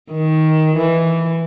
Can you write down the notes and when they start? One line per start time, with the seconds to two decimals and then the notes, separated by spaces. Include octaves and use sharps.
0.11 D#3
0.77 E3